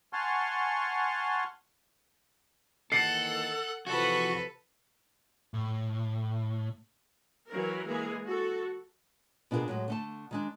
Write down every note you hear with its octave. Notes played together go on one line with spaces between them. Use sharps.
F#5 G#5 A5 C6 C#6 F6
D#3 E3 A#3 A4 F#5 C7 C#7
C3 E3 F3 F#4 A4 B4
A2
E3 F#3 A#4
E3 G#3 A#3 G#4
F#4 A4
B2 D4 F4 F#4 G#4 A#4
A2 F#3 G#3
D3 A3 A5
D#3 G#3 D4